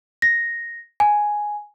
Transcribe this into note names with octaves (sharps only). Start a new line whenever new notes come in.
A#6
G#5